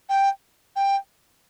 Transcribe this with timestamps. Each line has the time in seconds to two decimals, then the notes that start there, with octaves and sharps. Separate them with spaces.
0.09 G5
0.76 G5